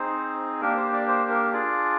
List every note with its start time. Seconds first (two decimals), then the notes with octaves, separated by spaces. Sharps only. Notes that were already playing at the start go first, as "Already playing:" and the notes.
Already playing: C4 D#4 G#4 C5
0.61 A#3 D4 G4 A#4
0.77 C5
0.92 D5
1.08 C5
1.30 A#4
1.53 D4 F4 G#4 D5